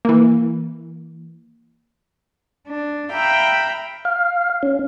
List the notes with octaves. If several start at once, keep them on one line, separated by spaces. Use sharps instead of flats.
E3 A#3
D4
E5 F5 G5 A#5 B5
F5
C#4